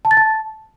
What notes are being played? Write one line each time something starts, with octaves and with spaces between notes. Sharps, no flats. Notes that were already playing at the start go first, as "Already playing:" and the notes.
A5
A6
A5